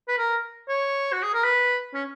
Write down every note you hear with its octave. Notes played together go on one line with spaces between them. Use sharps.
B4
A#4
C#5
F#4
G#4
A#4
B4
C#4